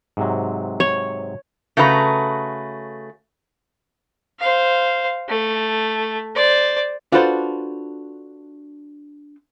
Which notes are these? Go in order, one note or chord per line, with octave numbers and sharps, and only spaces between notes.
G#2 C3 F#3
C#5
C#3 A3 F#4 B4 D#5 A#5
C5 F5
A3
C5 D5
D4 F4 F#4 A4 B4 C5